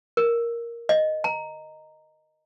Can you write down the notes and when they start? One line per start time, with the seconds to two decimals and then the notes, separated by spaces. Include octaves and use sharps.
0.17 A#4
0.89 D#5
1.24 A#5